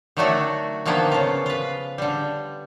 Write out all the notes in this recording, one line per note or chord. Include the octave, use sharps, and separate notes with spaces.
D3 D#3 F#3 A3 D4 F#4
D3 D#3 F3 A#3 B3
C#3 F4
F4 B4
D3 G3